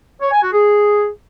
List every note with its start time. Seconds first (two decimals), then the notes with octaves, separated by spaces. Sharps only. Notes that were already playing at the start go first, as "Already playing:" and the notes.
0.21 C#5
0.32 G#5
0.42 F#4
0.53 G#4